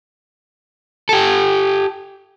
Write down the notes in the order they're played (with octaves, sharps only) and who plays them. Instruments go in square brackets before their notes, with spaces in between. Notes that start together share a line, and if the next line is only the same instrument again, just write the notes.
[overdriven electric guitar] G4 A4